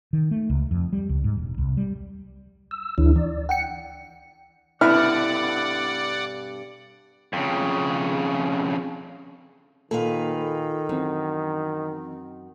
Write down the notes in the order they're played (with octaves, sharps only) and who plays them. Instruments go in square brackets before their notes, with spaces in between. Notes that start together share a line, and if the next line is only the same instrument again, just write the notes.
[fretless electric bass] D#3
A3
C#2
F2
G3
C#2
G#2
E1
C2
G3
[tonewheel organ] E6
[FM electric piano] D2 [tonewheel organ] E3 D4 E4
[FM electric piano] E3 [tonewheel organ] D5
[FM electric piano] F#5 G5 C#7
[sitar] G2 B2 A4 [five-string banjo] E4 [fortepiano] B4 F6 [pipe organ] D5 F#5
[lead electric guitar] F2 C#3
[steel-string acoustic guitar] A#2 B4 F5 [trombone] D#3 [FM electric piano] A4
[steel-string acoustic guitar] F#2 [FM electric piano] E3 C4